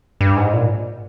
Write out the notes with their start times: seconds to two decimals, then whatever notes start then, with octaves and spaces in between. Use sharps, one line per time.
0.21 G2
0.37 G#2
0.53 A#2